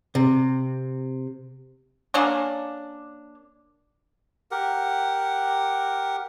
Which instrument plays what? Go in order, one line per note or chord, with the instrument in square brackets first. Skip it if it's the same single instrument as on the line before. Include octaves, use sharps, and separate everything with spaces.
[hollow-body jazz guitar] C3
[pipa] A#3 C#4 D4
[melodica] G4 A#4 F#5